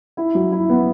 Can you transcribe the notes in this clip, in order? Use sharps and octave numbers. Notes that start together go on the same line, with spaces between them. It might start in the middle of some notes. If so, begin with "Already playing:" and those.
E4
F#3
E4
B3